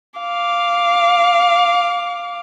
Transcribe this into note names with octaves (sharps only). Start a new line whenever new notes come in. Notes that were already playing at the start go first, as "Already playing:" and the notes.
F5 D6